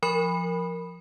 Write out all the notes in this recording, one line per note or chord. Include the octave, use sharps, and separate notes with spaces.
F3 A#4 B5